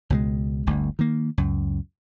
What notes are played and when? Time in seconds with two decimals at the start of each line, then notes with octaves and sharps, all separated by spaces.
0.10 C#2 B2 G3 G#3
0.67 G1 D2
0.99 D#3 A#3
1.38 C#2 F#2